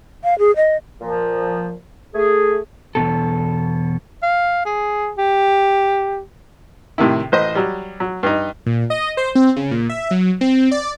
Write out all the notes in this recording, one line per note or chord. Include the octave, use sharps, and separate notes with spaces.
F5
G#4
D#5
A#2 F3
A3 G#4
E2 G#2 B2 A4
F5
G#4
G4
A2 C3 D#3 E4
A1 C5 D#5
F#3 G3
F#3
G2 D#4
A#2
D#5
C5
C4
C#3
A#2
E5
F#3
C4
D5